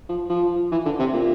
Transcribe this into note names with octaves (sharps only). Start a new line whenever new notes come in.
F3
F3
E3
D3
C3
A#2